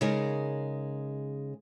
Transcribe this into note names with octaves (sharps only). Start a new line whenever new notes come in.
C#3 G#3 D#4 G#4 A#4